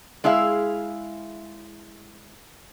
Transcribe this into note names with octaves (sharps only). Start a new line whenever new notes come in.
G#3 E4 G#4 E5 F5